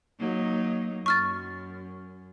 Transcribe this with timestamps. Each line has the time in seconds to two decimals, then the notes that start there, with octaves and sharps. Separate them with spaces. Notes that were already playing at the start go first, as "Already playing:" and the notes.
0.19 F#3 A#3 D#4
1.06 F#2 C#6 F6 A6